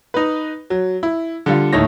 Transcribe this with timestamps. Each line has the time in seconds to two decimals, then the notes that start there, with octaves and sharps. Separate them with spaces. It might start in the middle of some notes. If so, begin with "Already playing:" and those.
0.14 D#4 B4
0.70 F#3
1.03 E4
1.46 D3 G3 F4
1.73 D#2 A2 A3 D#4 C#5 A#6